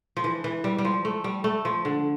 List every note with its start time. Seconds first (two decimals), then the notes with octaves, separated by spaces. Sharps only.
0.17 F3
0.24 E3
0.44 E3
0.64 G3
0.78 G3
0.85 F3
1.05 A3
1.24 G3
1.44 A3
1.65 F3
1.85 D3